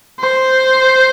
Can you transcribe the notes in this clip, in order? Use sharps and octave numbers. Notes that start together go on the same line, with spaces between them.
C5